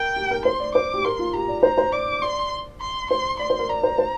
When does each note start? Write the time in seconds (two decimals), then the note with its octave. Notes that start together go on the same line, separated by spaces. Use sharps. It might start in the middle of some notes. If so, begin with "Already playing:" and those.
Already playing: A#4 G5
0.16 G4
0.31 A#4
0.45 C5 C6
0.60 D5
0.75 C5 D6
0.94 G4
1.04 A#4 C6
1.19 F4
1.34 G4 A#5
1.48 D5
1.63 C5 A#5
1.78 C5
1.92 D5 D6
2.22 D5 C6
2.81 C6
3.11 C5 C6
3.39 D5 C6
3.50 C5
3.59 A#4
3.69 D5 A#5
3.83 C5
3.98 C5